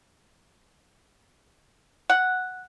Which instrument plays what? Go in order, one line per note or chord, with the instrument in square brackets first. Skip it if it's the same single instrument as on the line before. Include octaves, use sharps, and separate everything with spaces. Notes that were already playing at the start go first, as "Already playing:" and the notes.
[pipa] F#5